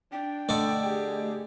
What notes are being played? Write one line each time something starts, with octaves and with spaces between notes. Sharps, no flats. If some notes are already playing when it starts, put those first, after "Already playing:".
D4 G5
D3 A3 D5 D#5 C#6
G4 G#4